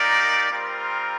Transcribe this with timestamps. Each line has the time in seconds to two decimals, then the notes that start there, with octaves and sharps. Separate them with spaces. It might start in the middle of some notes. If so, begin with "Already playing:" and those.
Already playing: A#3 D#4 G4 A#4 D5
0.50 G3 C4 F4 A#4